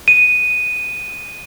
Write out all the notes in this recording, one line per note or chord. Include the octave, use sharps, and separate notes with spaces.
D#7